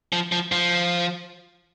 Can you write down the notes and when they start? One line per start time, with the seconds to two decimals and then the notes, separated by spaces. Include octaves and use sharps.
0.13 F3
0.32 F3
0.52 F3